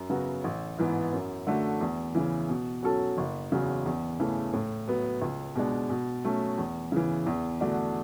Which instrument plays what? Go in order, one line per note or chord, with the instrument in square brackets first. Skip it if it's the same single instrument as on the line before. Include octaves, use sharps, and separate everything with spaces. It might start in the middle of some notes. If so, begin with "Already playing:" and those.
Already playing: [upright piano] F#2
C#3 F#3 B3 F#4
A1
G#2 E3 B3
F#2
D3 A3 D4 F#4
E2
C#3 E3
B2
F#3 C#4 F#4 A4
F#1
E2 C#3 F#3
E2
C#3 E3 A3
A2
F#3 B3
C#2
B2 G#3 D4
B2
F#3 A3 C#4
E2
C#3 E3
E2
D3 A3 D4 F#4